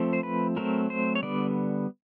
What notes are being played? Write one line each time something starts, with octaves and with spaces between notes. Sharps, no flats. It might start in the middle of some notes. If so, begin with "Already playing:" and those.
Already playing: F3 A3 C4
C5
B4
F#3 A3 C4 A#4
C5
C#5
D3 G3 B3 D5